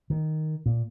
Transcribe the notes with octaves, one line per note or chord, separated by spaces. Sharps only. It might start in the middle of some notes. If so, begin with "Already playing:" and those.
D#3
A#2